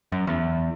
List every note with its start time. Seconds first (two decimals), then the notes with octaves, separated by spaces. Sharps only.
0.12 F#2
0.27 E2